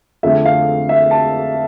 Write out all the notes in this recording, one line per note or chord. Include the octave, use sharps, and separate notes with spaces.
F2 D3 A3 C4 E5
F5
E5
A5